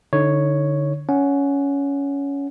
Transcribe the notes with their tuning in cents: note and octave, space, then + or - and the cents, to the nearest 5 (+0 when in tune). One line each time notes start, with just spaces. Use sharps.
D3 +0 D#4 +25 C#5 +0
C#4 +15 F#5 +0